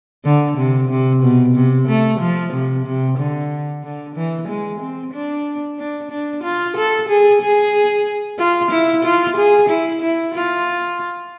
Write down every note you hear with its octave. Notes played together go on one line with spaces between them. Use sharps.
D3
C3
C3
B2
C3
A3
F3
C3
C3
D3
D3
E3
G#3
C4
D4
D4
D4
F4
A4
G#4
G#4
F4
E4
F4
G#4
E4
E4
F4